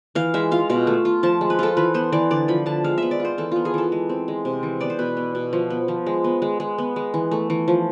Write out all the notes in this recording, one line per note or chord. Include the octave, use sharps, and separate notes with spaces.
E3 F5
G#3 E5
F4 F5
B2 F5
A3
F4
F3 A5
G#3
B4
F4 A4
E3 B4
B3 C5
E3 D5
D3 D5
F3 B5
D3 A5
G#3 F5
B3 E5
D5
F4
C5
E3 A4
B3 F4
G#4
E3 A4
G#3
C4
G#3
C3
E3
B3 D5
C5
B2 B4
B3
B2
F3
B3
F3
G#3
B3
G#3
G#3
B3
G#3
E3
A3
E3
F3